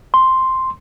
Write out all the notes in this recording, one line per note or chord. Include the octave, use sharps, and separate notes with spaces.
C6